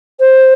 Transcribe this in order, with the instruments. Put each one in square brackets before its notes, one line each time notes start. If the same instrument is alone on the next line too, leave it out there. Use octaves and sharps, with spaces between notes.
[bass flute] C5